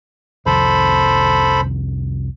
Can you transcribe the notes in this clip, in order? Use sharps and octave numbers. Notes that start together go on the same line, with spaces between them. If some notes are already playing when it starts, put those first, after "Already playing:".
C2 F2 D#3 A4 C5 B5